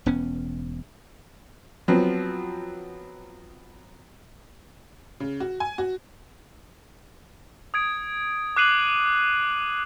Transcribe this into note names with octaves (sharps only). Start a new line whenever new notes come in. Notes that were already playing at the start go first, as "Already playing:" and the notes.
E1 B3 C#4
F3 F#3 B3 C4
C#3
F#4
G#5
F#4
D#6 G#6 D7
D6 F#6 C7 D#7 F#7